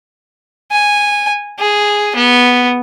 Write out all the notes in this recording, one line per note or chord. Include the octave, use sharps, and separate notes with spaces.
G#5
G#4
B3